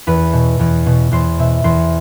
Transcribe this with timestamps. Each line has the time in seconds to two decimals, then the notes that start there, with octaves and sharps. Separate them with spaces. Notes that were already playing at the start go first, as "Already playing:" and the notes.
0.07 E2 B4
0.33 B2
0.59 E2
0.86 B2
1.12 E2 C5
1.39 B2 E5
1.64 E2 C5